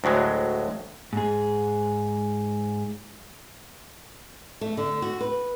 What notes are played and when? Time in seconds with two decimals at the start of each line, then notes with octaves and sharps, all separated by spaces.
0.04 D2 A2 F#3 G#3
1.13 G#2 G#4
4.61 A3
4.77 D3
5.02 F#4
5.21 B4